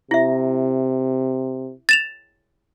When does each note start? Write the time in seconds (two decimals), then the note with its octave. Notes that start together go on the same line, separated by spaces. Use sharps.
0.11 C3 E4 E5
1.89 A6 E7 F7